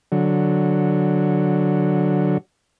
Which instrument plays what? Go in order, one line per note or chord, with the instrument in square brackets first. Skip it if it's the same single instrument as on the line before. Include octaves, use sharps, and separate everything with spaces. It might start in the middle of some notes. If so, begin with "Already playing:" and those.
[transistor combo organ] D3 F#3